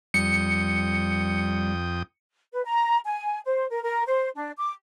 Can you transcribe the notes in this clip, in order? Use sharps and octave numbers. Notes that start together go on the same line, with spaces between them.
F2 G3 G5 D#6 C#7
B4
A#5
G#5
C5
A#4
A#4
C5
D4
D6